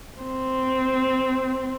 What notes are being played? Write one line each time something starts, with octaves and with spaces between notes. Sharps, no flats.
C4